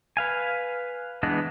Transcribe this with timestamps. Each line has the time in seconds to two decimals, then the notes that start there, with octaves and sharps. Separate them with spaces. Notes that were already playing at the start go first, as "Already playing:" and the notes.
0.17 B4 F5 G#5
1.23 E3 G#3 B3 D4 D#5